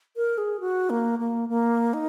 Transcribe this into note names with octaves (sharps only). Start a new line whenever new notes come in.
A#4
G#4
F#4
A#3
A#3
A#3
D#4